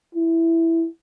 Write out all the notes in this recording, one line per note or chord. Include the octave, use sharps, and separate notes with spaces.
E4